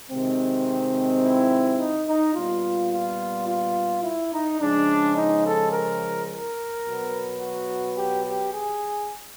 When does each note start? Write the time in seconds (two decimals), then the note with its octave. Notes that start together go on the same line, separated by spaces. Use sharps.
0.10 C3 D#3 G#3 C4
1.22 E4
1.78 D#4
2.07 D#4
2.34 A#2 G3 B3 F4
2.90 F4
3.46 F4
4.03 E4
4.31 D#4
4.59 C#3 F3 G#3 D4
5.16 D#4
5.44 A4
5.71 A#4
6.28 A#4
6.85 B2 F#3 B3
7.40 F#4
7.96 G4
8.24 G4
8.52 G#4